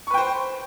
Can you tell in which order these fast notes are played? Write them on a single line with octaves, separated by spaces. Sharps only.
C#6 B4 G5 C5